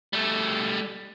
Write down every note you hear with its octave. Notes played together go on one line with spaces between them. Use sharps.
G3 A3